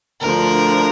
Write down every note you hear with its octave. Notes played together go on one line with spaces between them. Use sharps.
D2 D3 F3 A#4